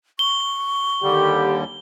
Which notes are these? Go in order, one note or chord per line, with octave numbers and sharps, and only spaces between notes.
C#6 G7
D#2 D3 G3 G4